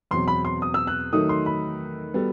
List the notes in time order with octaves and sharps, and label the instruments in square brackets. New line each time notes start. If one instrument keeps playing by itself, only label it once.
[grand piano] E2 B2 F#3 C4 [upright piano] C6
[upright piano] B5
C6
D#6
E6
F#6
[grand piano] D#3 F#3 A3 D#4 [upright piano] D#6
[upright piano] C6
B5
[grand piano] G3 B3 F#4 A4